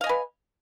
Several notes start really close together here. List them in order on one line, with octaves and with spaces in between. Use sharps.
F5 D#5 G#5 B4